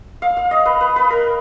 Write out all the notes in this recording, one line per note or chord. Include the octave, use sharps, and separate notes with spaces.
F5
F5
D#5
B4
B4
B4
A#4